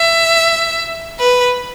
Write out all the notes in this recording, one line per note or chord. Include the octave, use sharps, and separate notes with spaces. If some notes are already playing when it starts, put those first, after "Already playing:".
Already playing: E5
B4